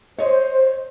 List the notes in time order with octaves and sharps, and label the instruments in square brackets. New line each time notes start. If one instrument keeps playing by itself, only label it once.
[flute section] C5 [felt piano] C#5 D#5